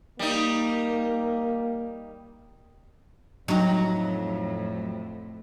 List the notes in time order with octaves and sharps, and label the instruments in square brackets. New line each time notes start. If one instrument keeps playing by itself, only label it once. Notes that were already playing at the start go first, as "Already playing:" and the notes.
[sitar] G3 D#4 [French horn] A#3
[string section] F2 A2 [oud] F#3 D#4